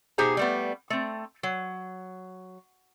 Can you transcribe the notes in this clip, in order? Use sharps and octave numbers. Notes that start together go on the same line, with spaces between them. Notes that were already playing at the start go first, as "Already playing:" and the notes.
B2 D#4 G4 G#4 C5 A#5
G3 A3 B3
A3 C4
F#3